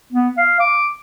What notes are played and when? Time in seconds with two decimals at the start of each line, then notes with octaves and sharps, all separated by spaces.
0.13 B3
0.37 F5
0.60 D6